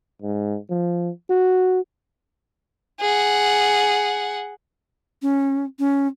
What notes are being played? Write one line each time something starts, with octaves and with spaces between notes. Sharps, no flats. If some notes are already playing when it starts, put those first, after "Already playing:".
G#2
F3
F#4
G#4 F#5
C#4
C#4